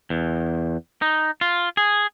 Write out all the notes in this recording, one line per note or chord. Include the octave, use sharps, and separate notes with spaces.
E2
D#4
F4
G#4